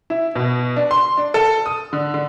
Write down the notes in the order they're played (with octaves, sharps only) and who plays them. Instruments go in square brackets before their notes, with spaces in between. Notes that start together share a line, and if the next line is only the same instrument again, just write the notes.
[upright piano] E4
B2
D4
C6
D4
A4
D#6
D3
D3